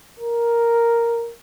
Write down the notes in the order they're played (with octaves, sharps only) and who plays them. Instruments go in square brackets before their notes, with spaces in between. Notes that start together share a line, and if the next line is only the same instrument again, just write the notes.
[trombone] A#4